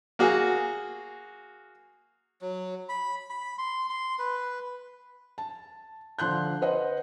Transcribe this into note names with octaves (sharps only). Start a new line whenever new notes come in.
A#3 F#4 G#4
F#3
B5
B5
C6
C6
B4
A5
D3 F3 C6 F#6 G6
B4 C5 D#5 F#5